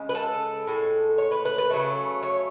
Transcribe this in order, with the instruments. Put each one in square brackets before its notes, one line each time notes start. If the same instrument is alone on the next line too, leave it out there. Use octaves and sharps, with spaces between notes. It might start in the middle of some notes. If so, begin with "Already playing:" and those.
Already playing: [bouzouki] C#3 G#3
B4
A4
A2 G#3
C#5
B4
B4
B4
C#3 F#3 A3
C#5